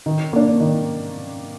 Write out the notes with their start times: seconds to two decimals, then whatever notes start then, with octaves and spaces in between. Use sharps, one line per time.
0.06 D#3
0.33 A#3 D4
0.60 D#3